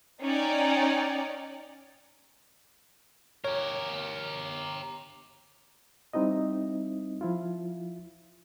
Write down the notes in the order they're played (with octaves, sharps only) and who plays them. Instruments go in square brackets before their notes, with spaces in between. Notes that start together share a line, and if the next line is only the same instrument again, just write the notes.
[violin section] C#4 D#4 D5 G5
[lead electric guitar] G4 A#4 [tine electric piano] C#5
[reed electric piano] G3 C4 D#4 E4 D#5
F3 E4 F4